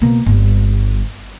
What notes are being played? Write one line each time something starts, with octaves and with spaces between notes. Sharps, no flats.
B2 A#3
G1 G3